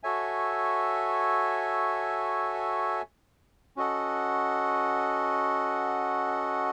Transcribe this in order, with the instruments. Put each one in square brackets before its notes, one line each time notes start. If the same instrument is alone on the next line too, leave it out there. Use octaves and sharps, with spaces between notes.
[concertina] F#4 A4 C#5 E5 G#5
C#4 F#4 A4 D#5 F#5